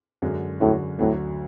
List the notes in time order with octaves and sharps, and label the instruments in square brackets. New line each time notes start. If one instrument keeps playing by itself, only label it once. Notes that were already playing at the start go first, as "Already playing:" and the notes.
[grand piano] F#2 D3 G#3 C#4 F#4
[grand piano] F#2 D3 G#3 C#4 F#4 [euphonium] A2
[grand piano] D2 D3 F#3 [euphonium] A2